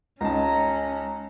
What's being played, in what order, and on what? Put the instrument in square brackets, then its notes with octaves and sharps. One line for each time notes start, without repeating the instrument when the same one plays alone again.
[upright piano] C#2 D#4 A5 [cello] C#4 [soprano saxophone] A#5